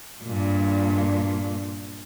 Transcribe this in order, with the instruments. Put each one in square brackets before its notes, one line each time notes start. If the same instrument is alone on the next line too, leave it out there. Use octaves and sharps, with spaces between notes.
[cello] G2 A#2